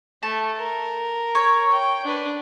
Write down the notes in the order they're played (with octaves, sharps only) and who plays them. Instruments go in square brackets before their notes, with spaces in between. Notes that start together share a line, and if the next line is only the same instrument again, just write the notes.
[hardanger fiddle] A3 [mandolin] A5
[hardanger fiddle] A#4
[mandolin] C#5
[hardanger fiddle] G5
D4 B4